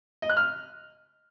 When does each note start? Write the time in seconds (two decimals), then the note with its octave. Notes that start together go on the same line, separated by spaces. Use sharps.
0.22 D#5
0.30 F#6
0.37 F6